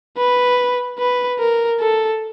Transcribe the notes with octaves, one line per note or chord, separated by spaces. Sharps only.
B4
B4
A#4
A4